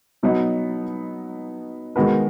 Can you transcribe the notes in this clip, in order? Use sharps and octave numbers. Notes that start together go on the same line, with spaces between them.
B2 F#3 B3 D#4
D#3 G#3 B3 F#4 B4